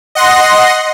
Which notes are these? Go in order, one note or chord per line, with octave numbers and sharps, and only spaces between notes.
D#5 F#5 C6 A#6